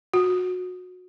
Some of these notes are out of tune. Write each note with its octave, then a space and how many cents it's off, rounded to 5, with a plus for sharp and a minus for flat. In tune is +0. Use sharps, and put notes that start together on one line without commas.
F#4 -25